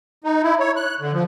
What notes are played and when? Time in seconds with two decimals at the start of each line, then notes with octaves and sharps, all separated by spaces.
0.24 D#4
0.43 E4
0.60 C#5
0.76 F#6
1.00 D3
1.13 F3